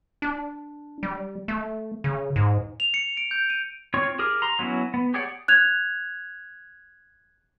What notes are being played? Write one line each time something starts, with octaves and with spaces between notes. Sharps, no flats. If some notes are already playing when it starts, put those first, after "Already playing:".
D4
G3
A3
C#3
G#2
F7
C#7
D7
G6
D#7
C4 F4 C#5 C#6
G4 G#4 A#4
A#5 C6
F#3 B3 C#4 E4
B3
G4 G#4 C#5 D5 F#5
F#6 G#6 F7